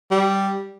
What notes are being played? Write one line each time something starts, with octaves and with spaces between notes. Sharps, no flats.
G3